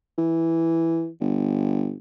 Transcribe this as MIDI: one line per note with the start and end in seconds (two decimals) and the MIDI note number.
0.18 1.09 52
1.20 1.95 31